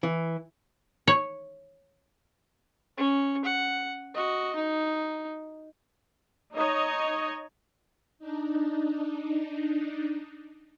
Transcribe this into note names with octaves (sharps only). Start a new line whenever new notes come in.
E3
C#5
C#4
F#5
F#4 D#5
D#4
D#4 C#5 D#5
D4 D#4